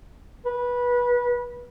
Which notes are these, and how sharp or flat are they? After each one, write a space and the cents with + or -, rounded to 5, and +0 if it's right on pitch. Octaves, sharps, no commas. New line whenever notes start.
B4 -20